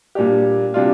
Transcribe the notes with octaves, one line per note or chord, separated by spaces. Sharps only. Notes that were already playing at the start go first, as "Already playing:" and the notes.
A#2 G3 D4 G4
C3 G3 D4 F4